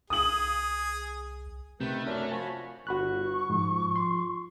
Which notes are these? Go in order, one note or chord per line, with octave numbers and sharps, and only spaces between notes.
C2 G#4 D#6 F#7
C3 D#3 A3 B4 G6
F#2 D4 A#5 F6
F3 F#4 C#5 G#5 A5 B5
G1 F#4 B5 C#6 F#6
G#2 F3
C6